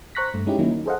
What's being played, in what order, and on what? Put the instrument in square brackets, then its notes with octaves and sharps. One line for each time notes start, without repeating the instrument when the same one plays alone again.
[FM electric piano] C5 A#5 C#6 F#6 A#6 B6
G2 A3
G#3 C#4 D#4 E4 G4
D#3 F#3 A#3 C#4 D#4 E4
D#4
G#4 A4 C5 D#5 F5 F#5